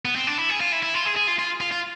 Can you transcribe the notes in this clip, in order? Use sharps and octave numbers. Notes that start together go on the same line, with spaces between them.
B3
C4
D4
E4
G#4
F4
E4
E4
F4
G#4
G#4
F4
F4
F4
F4